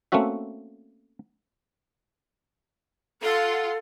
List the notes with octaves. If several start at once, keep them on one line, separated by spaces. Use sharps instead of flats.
A3 A#3 C4 C#4 F#4 E5
F4 A4 F#5 C6